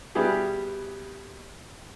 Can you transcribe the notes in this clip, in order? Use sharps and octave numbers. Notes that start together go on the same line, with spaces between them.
B2 G3 B3 E4 G4 G#4